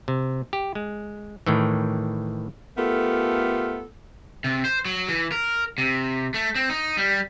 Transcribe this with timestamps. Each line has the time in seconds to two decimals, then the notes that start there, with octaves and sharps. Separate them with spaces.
0.08 C3
0.53 G4
0.75 G#3
1.46 A2 D#3 E3
2.76 A3 B3 F4 G4 A4 A#4
4.44 C3
4.65 C5
4.85 F#3
5.09 E3
5.32 A#4
5.78 C3
6.34 A3
6.55 C4
6.70 D#4
6.97 G3